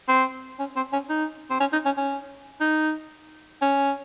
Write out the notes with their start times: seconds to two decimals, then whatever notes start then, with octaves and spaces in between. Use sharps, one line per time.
0.08 C4
0.59 C#4
0.76 C4
0.93 C#4
1.09 D#4
1.50 C4
1.60 C#4
1.72 D#4
1.85 C#4
1.97 C#4
2.61 D#4
3.61 C#4